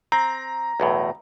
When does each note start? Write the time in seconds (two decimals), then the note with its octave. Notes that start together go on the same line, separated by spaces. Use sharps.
0.12 C4 A#5
0.80 B1 E2 A2